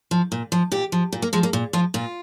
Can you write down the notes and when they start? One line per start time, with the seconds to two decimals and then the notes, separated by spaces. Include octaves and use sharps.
0.11 F3
0.32 A#2
0.52 F3
0.72 A#2 G4
0.92 F3
1.13 A#2
1.22 A#3
1.33 F3 G#3
1.43 A#3
1.53 A#2
1.73 F3 F4
1.94 A#2 F4